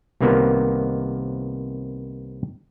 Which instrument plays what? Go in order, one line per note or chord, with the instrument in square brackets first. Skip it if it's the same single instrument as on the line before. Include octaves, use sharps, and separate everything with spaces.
[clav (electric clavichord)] C2 C3 D#3 A#3 B3